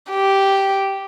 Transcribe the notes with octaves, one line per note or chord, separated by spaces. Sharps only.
G4